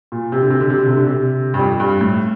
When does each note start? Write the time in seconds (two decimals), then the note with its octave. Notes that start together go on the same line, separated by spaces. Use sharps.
0.12 A#2
0.32 C3
0.42 D3
0.50 C3
0.61 D3
0.70 C3
0.78 D3
0.88 C3
0.97 D3
1.07 C3
1.54 G2
1.59 F2
1.80 G2
2.01 A2